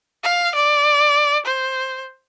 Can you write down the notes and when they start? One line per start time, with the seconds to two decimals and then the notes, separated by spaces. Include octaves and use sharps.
0.24 F5
0.55 D5
1.45 C5